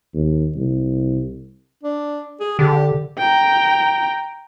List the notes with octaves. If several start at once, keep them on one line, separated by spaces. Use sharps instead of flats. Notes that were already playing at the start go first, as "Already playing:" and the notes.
D#2
C2
D4
G#4
D3 G4
G5 A#5